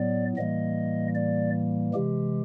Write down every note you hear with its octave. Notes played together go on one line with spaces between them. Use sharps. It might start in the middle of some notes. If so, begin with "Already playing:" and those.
Already playing: A2 F#3 B3 D5
A2 E3 G3 A#3 D#5
D5
C3 E3 G#3 G4